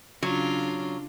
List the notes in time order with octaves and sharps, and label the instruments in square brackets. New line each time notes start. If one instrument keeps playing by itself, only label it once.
[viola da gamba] C#3 D4 F4 [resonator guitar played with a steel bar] F#3